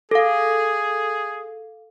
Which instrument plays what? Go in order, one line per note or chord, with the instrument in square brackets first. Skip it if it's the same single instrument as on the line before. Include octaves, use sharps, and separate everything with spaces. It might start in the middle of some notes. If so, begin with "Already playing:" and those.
[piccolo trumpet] G#4 [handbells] A4 F5